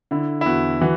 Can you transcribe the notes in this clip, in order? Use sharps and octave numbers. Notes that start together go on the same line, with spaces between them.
D3 E4
E4
E2 F#4
E3 F#4